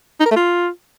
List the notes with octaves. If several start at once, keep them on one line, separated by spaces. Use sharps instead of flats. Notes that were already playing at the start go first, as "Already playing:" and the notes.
D#4
A#4
A3
F4